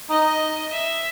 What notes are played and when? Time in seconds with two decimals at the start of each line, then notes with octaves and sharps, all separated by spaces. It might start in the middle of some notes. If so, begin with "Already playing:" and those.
0.10 D#4 D#5
0.72 E5